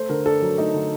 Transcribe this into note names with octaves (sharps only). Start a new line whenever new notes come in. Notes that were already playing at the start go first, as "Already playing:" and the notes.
Already playing: A3 C5
D3 A#4
D4 A4
F#3
A3 D#4
D3